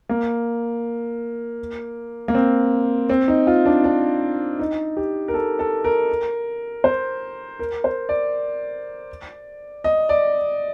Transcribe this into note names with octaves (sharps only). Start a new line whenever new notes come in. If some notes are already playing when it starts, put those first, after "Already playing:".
A#3
A#3
C4
C4
D#4
F4
D4
D4
D#4
G4
A#4
A4
A4
A#4
C5
A#4
C5
D5
D#5
D5